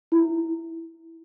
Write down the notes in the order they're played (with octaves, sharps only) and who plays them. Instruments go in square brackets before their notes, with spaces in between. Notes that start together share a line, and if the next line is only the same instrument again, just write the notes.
[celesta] E4